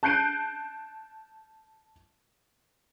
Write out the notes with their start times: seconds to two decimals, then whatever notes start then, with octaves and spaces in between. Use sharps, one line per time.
0.03 A5 F#6 G6 C7 D7 D#7